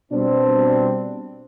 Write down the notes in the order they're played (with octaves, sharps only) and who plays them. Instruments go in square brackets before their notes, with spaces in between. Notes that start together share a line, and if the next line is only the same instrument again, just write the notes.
[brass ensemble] B2 G3 C4 D4